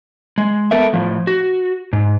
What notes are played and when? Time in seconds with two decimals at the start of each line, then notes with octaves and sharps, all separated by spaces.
0.38 G#3
0.71 B3 A4 A#4 E5
0.93 A2 F3
1.27 F#4
1.93 G#2